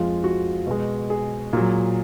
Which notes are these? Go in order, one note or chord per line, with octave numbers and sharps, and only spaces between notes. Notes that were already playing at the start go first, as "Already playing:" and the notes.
Already playing: F2 F3 G#3 F4
F#4
B2 G#3
G#4
A#2 F#3